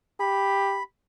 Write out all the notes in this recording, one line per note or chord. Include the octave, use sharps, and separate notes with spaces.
G4 B5